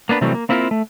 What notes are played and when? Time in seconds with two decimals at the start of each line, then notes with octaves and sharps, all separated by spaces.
0.09 A#3 B3 D4 B4
0.21 C3 E3 F#3 G3 A3 C4
0.35 A#3
0.49 A#3 C4 E4 F4 G4 A#4
0.71 A3